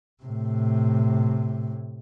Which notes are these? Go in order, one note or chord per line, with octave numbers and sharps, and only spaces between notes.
A2 C3